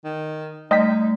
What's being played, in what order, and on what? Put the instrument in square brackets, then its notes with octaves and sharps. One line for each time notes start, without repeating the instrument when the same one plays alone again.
[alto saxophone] D#3
[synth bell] G3 A3 [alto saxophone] D#4 [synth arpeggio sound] D#5 G5 B6